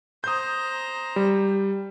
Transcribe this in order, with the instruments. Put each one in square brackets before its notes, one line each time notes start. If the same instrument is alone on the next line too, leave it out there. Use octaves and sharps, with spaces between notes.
[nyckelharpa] C5 A#5 [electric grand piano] D#6 G6
[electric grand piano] G3